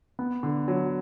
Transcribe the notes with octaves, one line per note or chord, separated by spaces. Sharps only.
B3
D3
F#3